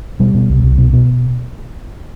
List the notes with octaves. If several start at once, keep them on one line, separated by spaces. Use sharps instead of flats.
B2 G3
B2
C2
C2
B2
B2